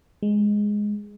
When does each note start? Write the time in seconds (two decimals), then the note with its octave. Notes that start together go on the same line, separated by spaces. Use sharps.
0.23 G#3